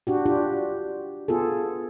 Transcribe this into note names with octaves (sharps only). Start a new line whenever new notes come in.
D4 F#4 G4
D4 F4 G4
B3 F4 G#4 A4